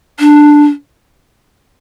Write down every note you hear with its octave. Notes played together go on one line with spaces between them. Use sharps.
D4